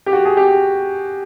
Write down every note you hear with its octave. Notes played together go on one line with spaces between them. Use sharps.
G4
F#4
G#4
G4